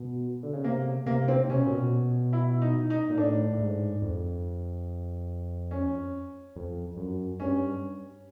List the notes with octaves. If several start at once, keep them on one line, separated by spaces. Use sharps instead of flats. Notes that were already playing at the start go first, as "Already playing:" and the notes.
Already playing: B2
D3
C#3
C3 A#3
C3 A#3
C4
C3 C#4
B2
A#2
B2
E4
D#4
D#4
A#2
A2 D4
A2
G#2
F2
C#4
F2
F#2
G2 C#4